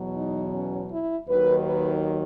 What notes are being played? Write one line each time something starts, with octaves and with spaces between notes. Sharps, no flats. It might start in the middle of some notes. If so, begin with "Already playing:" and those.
Already playing: E2 B2 F#3
D#4
C#4
E4
D#2 D#3 F#3 B4
B4